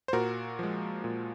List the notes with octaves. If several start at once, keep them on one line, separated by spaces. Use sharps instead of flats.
C5
A#2 F#4 A#4
F3 G#3
A#2